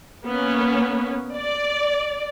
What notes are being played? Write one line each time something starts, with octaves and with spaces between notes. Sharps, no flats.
A#3 B3 C#4
D5